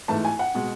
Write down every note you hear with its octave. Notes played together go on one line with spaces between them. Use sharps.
G#2 E3 A3 A5
G#5
F#5
B2 G#3